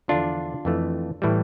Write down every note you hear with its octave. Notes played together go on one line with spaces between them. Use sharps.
E2 D3 F3 D4 F4
F2 E3 A3
A2 E3 G3